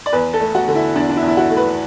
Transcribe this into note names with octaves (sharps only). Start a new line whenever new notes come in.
D5
E2 B4
A4
A3
F#4
D3
E4
E2 D4
D4
E4
E2
E4
F#4
A3
B4